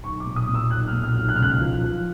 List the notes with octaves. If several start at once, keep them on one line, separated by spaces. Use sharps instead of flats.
B1 C#6
D6
A#2
D#6
A#2
E6
B1 F#6
F6
A#2
F6
B1
F#6
F6
C#2 F#6
F3
F3